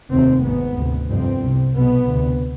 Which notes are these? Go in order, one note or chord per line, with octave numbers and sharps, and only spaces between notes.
F1 D#2 C4
G#1 G#2 B3
D2 C3
G1 F2 C3 C4
C2 C3
B1 B2 B3
D2 C3